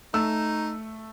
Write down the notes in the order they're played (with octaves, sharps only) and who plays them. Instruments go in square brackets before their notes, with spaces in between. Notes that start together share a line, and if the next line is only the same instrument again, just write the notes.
[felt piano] A3 E6 [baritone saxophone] D#4